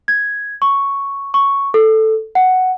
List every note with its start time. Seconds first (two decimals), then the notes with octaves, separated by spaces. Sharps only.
0.08 G#6
0.62 C#6
1.34 C#6
1.74 A4
2.35 F#5